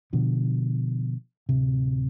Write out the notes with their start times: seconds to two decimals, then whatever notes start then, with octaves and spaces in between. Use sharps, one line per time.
0.13 B2 D3 F3
1.49 D1 C3